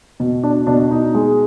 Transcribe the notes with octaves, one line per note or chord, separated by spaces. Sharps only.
B2
D4
B2 D4
D#4
G#3